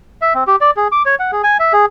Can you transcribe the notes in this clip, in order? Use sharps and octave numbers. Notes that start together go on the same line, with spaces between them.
E5
C4
G4
D5
G#4
D6
C#5
F#5
G#4
G#5
E5
G#4